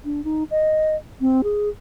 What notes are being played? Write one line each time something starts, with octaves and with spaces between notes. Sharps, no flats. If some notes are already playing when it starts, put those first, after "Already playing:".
D4
D#4
D#5
C4
G#4